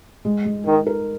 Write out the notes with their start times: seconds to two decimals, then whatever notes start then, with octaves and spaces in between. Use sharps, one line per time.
0.25 G#3
0.45 G#3
0.66 D#3 D#4
0.87 A#4